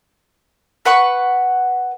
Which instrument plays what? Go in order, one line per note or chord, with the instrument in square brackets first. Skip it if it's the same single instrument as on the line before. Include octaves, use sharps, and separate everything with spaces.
[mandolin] B4 F#5 C#6